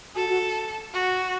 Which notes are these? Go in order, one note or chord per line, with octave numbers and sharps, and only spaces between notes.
F#4 A4
F#4
F#4